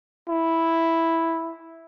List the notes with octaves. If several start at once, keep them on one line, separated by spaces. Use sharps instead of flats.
E4